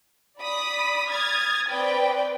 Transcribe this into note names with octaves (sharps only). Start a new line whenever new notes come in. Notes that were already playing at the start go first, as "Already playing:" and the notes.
D5 B5 D#6 B6
D#6 F6 G#6 A6
C4 B4 D5 G5